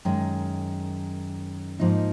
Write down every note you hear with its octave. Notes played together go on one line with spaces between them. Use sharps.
F#2 D#3 G#3
G#2 F3 A#3 D#4